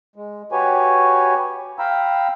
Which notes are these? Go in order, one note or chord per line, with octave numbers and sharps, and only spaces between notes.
G#3
F#4 G4 B4 C#5 G#5
F5 G5 A#5 B5 E6